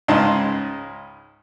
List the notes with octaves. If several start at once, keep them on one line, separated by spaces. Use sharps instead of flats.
C#2 G#2 C#3 D#4 A5 C6